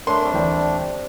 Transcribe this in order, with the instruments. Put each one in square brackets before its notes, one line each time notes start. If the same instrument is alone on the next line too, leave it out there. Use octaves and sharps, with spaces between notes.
[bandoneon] A3 D4 [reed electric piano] A#4 C#5 [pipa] C6
[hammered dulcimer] G3 C4
[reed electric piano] D2 E3 G5